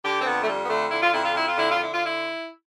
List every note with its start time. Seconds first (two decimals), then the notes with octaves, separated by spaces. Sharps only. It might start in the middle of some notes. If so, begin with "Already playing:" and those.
0.03 D3 G4
0.20 C4
0.25 F2 B3
0.42 A3
0.47 F2 G3
0.65 B3
0.69 D3 A3
0.91 D3 E4
1.02 F4
1.13 F2 E4
1.24 F4
1.34 F2 E4
1.47 F4
1.57 D3 E4
1.70 F4
1.78 D3 E4
1.93 F4
2.05 E4